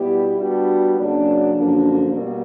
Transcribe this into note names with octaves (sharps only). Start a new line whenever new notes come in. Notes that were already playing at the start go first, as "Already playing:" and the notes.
Already playing: B2 G3 B3 E4 G4
G3 B3 D4 F#4
F#2 C#3 F#3 A#3 D4
F#2 D3 F3 A#3 D4
B2 G3 A#3